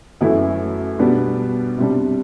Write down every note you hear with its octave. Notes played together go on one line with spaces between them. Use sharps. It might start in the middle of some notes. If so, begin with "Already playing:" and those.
F#2 E3 A3 E4
B2 G3 B3 D4
C3 G3 D4